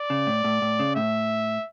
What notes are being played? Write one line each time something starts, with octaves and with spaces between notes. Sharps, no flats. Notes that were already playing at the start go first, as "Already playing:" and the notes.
Already playing: D5
C#3
A2
A2
A2
C#3
A2 E5